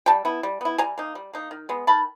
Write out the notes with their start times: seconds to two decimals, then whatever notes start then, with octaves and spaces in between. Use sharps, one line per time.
0.06 G3 G5 A5
0.25 B3 E4
0.43 G3
0.61 B3 E4
0.78 G3 G#5 A#5
0.98 A#3 D#4
1.15 G3
1.33 A#3 D#4
1.51 D#3
1.69 G#3 B3
1.87 D#3 A5 B5